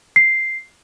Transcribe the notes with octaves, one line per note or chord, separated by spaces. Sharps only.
C7